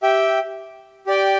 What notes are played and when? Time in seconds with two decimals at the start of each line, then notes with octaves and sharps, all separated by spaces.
0.02 G4 E5 G5
1.07 G4 D5 G5